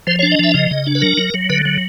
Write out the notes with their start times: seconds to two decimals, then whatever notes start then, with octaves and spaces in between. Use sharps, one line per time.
0.07 F3 C5
0.19 C#5
0.23 D4
0.32 D#5
0.39 F3 E5
0.54 C#3 D#5
0.71 C#3
0.87 D4
0.95 B4
1.02 F#3 A#4
1.17 F#3
1.34 F#3
1.50 D3 B4
1.65 F#3